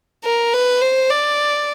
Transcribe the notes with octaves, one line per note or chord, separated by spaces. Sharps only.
A#4
B4
C5
D5